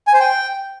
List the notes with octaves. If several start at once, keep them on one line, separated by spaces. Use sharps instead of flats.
G#5
C5
G5